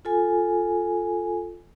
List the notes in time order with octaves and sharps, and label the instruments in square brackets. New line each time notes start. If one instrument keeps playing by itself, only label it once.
[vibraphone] F4 A4 G#5